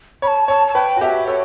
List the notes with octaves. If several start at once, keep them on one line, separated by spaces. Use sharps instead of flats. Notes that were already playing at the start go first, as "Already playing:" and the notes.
C#5 B5
A5
C#5 A5
A5
B4 G5
F#4
G4 E5
A4 C#5